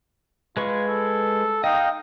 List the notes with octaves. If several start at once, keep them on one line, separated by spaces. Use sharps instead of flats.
G#3 F4 B4 C#6
A4
D#4 D#5 F5 G5